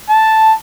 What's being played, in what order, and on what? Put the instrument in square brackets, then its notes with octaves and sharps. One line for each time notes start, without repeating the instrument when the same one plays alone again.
[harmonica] A5